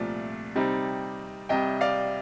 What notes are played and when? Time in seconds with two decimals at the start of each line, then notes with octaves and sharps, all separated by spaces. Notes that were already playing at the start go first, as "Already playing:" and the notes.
Already playing: C2 A#2 F3 A3 D5
0.55 C3 G3 C4 D#4
1.49 C2 C3 G3 D#5 G5
1.81 D5 F5